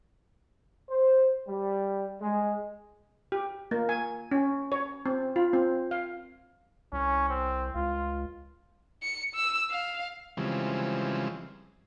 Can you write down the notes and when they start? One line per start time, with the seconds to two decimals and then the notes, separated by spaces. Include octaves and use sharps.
0.89 C5
1.47 G3
2.20 G#3
3.32 G4
3.71 A#3
3.89 G#5
4.31 C#4
4.72 C#5
5.06 C4
5.36 F4
5.53 C4
5.91 F5
6.92 C2 C#4
7.29 C4
7.75 C#2 F4
9.03 C#7
9.35 E6
9.71 F5
10.37 C#3 E3 F3 G3 G#3 C4